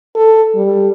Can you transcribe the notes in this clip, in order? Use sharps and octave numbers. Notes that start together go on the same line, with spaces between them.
A4
G3